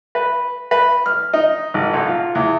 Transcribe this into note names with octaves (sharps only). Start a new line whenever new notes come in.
B4
B4
F6
D#4
G#1
B1
F4
E2